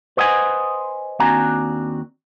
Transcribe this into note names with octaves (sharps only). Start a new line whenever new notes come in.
B4 C5 D#5 F#5 G#5
D#2 C4 D4 F#4 G#5 A#5